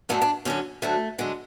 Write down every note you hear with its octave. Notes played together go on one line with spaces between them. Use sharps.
F#2 D3 F#3 A3
D4
F#2 D3 F#3 C#4
D2 D3 F#3 A3
D3 F#3 G#3